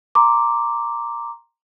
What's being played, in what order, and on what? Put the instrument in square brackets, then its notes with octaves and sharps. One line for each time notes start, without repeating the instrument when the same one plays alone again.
[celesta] A#5 C6 D6